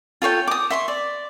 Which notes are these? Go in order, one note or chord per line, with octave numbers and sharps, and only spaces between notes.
F4 A4 C#5 G5
D6 D#6
E5 C6 C#6
D5